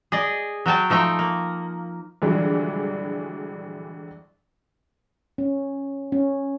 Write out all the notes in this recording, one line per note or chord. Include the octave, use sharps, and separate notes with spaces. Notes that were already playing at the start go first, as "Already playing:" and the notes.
G#4 D5 D#5
F#3 F#4 G5 A5
F3 A3 D#4 G5
A#3
A#1 G2 D3 E3 F#3 G#3
C#4
C#4